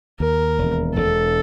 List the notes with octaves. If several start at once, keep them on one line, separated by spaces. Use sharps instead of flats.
D#2 A#4
E1
E1 A4